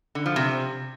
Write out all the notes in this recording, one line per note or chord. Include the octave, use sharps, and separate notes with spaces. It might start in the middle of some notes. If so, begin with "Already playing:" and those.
D3
F3
C3